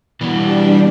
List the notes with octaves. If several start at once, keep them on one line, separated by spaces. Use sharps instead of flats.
B2 E3 G3 B3 D4